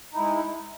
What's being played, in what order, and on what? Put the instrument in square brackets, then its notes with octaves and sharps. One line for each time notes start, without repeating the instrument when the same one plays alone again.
[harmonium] D#4
E4
G#3